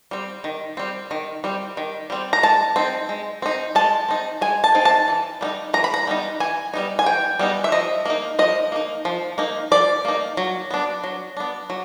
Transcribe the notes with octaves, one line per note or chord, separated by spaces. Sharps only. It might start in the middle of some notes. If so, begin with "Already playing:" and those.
G3 C4
D#3
G3 C4
D#3
G3 C4
D#3
G3 C4
A#5
G#3 A5
C4 D#4
G#3
C4 D#4
G#3 A5
C4 D#4
G#3 G#5
A5
C4 D#4
A5
E3
G3 B3 D#4
E3 A#5
B5
A#5
G3 B3 D#4
E3 G#5
G3 B3 D#4
G#5
E3 G5
G3 B3 D#4
E5
F3 D#5
A#3 D#4
F3 D#5
A#3 D#4
F3
A#3 D#4
F3 D5
A#3 D#4
F#3
B3 D4
F#3
B3 D4
F#3